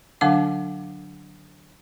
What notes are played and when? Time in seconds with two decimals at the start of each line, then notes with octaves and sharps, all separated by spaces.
0.21 D3 F#3 D4 F5 F#5 D6